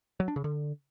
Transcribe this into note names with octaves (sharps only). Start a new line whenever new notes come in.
F#3
D4
C#3
D3